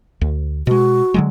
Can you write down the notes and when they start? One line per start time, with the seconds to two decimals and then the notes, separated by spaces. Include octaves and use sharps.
0.21 D2
0.67 B2 G#3 F#4
1.14 D3 F#3 G#3